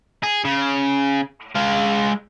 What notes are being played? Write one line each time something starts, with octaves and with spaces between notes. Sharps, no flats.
G#4
C#3
G#3 F5